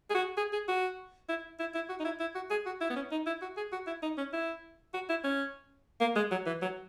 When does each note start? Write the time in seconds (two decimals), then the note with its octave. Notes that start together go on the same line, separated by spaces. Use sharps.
0.10 G#4
0.15 F#4
0.38 G#4
0.53 G#4
0.68 F#4
1.29 E4
1.60 E4
1.75 E4
1.90 F#4
2.00 D#4
2.05 E4
2.20 E4
2.35 F#4
2.51 G#4
2.66 F#4
2.81 E4
2.90 B3
2.96 C#4
3.12 D#4
3.27 E4
3.42 F#4
3.57 G#4
3.73 F#4
3.87 E4
4.03 D#4
4.18 C#4
4.33 E4
4.94 F#4
5.10 E4
5.24 C#4
6.01 A#3
6.16 G#3
6.31 F#3
6.46 E3
6.62 F#3